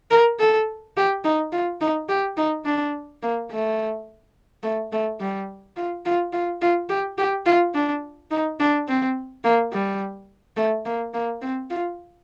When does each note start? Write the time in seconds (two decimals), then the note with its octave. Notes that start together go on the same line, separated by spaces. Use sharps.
0.11 A#4
0.39 A4
0.97 G4
1.24 D#4
1.52 F4
1.81 D#4
2.09 G4
2.37 D#4
2.65 D4
3.22 A#3
3.51 A3
4.63 A3
4.92 A3
5.20 G3
5.76 F4
6.05 F4
6.33 F4
6.62 F4
6.89 G4
7.18 G4
7.46 F4
7.74 D4
8.31 D#4
8.60 D4
8.88 C4
9.44 A#3
9.73 G3
10.57 A3
10.85 A#3
11.14 A#3
11.41 C4
11.70 F4